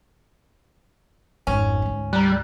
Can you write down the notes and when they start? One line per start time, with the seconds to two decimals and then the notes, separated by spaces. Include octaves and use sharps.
1.47 G#1 F2 C#4
1.82 D2 G#2
2.13 G3 A#5 F#6